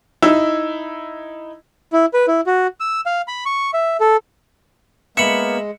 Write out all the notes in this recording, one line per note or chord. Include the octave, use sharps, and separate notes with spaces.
D#4 E4 E6
E4
B4
E4
F#4
E6
F5
B5
C#6
E5
A4
G#3 A#3 B3 E5 B5 C#7